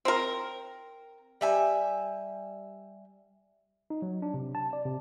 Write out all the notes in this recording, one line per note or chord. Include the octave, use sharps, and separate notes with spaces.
C4 A#4
G3 E5 G#5
D#4
F#3
D4
C3
A5
D5
C3